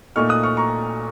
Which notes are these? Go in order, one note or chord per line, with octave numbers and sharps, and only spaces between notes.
A#2 A3 D#4 C#6 F6
D#6 F#6
C#6 F6
A#5 C#6